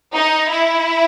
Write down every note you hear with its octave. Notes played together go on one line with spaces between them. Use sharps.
D#4
E4